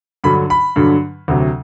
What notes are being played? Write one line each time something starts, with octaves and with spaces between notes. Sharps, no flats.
G2 D3 F#3 B5
B5
G2 D3 F#3
D2 C3 F#3